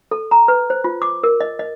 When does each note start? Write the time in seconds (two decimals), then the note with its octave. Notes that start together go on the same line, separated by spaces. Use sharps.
0.11 A4
0.31 A#5
0.48 B4
0.70 C5
0.84 F4
1.02 D6
1.23 A#4
1.41 D#5
1.59 D#5